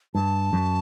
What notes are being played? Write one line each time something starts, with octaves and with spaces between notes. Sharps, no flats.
G2 A5
F#2